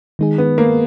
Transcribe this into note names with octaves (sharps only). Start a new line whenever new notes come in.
D#3 G#3 D#4 G#4
B3
A#3